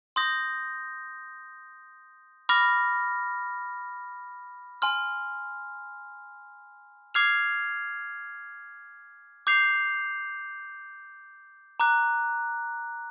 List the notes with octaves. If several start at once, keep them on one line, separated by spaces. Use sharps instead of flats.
C6 D#6 G6 A#6
B5 D6 F6 A#6
G#5 C6 F6
D6 F6 G#6 C7 F7
D6 G6 C7 F7
A#5 D6 F#6